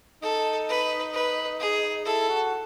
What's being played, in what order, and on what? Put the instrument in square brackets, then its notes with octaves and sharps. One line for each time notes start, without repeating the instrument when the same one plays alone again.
[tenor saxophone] D#4 [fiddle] A4
[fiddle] B4
B4
G#4
[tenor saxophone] E4 [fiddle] A4
[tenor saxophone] F#4